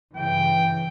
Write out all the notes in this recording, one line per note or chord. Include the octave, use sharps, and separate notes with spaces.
G2 C#3 E3 G5